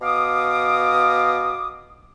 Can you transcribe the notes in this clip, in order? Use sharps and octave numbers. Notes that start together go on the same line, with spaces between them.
B2 F5 D6 D#6